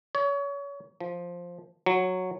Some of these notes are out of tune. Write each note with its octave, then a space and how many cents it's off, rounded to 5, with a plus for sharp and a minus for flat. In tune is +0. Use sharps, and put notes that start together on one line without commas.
C#5 +30
F3 +5
F#3 -5